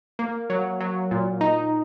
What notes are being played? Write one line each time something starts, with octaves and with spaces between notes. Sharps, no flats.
A#3
F#3
F#3
A#2
D#4